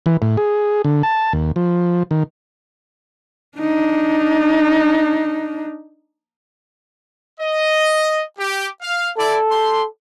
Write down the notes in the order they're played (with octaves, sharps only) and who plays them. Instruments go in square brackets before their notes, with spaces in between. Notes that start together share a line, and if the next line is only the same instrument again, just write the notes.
[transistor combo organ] E3
A2
G#4
D3
A5
D#2
F3
D#3
[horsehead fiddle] D4 D#4
[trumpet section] D#5
G4
F5
[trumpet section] E4 D5 [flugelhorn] A4
[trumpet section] G4 C6